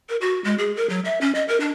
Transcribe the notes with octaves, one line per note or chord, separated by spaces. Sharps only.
A#4
F#4
G#3
G#4
A#4
F#3
E5
C#4
D#5
A#4
D4